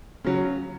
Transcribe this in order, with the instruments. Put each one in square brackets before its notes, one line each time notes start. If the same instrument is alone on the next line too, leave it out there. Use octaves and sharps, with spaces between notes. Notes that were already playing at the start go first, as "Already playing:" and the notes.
[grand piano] C#3 F#3